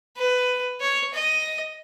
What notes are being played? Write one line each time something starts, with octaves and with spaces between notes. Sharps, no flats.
B4
C#5
D#5